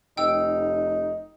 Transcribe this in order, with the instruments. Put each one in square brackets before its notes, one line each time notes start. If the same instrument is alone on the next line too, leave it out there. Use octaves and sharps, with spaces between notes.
[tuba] F1 [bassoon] D#4 [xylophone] G5 E6